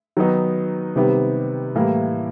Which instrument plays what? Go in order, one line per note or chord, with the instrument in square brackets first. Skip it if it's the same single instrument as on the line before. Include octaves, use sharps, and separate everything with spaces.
[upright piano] D#3 F#3 B3 D#4
C3 D#3 G3 B3
A2 E3 G3 A#3